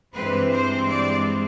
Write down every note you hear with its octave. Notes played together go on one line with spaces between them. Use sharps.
G2 E3 G#3 C4 B4
C5
D5